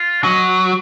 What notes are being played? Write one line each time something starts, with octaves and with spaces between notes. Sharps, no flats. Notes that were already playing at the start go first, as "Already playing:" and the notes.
Already playing: F4
F#3 D#5